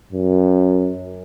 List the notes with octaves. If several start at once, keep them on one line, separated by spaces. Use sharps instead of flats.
F#2